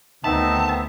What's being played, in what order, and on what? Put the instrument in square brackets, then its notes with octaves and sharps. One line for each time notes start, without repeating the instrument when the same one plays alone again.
[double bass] D2 [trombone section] D#3 D#4 [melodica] B3 C4 E5 [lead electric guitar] A5